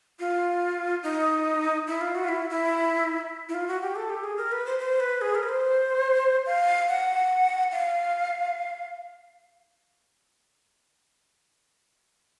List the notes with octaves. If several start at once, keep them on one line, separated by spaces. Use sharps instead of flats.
F4
D#4
E4
F4
F#4
F4
E4
E4
E4
F4
F#4
G4
A4
G4
G#4
A#4
B4
C5
C5
B4
G#4
A#4
B4
C5
F5
F#5
F5